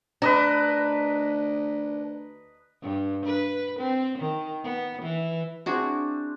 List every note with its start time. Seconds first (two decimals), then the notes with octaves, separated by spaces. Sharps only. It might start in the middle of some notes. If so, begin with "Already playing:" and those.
0.22 D2 D4 B4 D#5 A#5
2.82 G2
3.25 B4
3.79 C4
4.18 D#3
4.64 B3
5.02 E3
5.66 C4 D4 E4 F#4 G#4